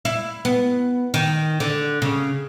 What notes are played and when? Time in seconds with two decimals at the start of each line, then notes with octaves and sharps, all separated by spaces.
0.05 E4
0.45 B3
1.14 D#3
1.60 D3
2.02 C#3